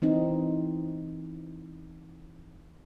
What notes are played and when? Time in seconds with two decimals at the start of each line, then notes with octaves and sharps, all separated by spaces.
0.02 E3 C4 D#4